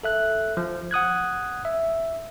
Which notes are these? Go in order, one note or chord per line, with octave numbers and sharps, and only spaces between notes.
A4 E5 F#6
F3
F#5 D#6 F#6 G#6
E5